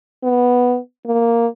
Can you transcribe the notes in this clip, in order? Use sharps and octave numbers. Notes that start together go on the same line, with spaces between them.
B3
A#3